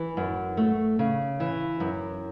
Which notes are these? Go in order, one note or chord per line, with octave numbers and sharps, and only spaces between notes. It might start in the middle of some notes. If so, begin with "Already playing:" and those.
Already playing: E3
F#2
A3
C#3
E3
F#2